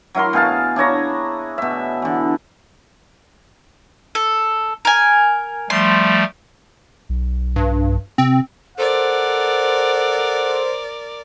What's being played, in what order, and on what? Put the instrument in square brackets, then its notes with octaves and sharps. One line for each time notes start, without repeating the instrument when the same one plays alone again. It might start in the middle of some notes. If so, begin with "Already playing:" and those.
[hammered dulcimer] F#3 E4 A#4 C6
B2 G#4 F5 A5
D4 E4 C#5 A#5
B2 E5
D3 E3
[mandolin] A4
A#4 G#5
[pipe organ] F3 G3 A3 [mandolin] C6
[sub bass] B1
[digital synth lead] G2
[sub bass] C3 [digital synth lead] C4
[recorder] A4 [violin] A#4 D5 [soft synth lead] C5 [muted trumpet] F#5